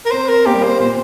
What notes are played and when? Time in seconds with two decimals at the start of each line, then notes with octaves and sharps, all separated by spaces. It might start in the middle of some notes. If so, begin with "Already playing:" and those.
0.06 A#4
0.11 C4 C5
0.29 A#4
0.46 A#3 G4
0.53 G3
0.61 A#3 C5
0.79 A#2 C5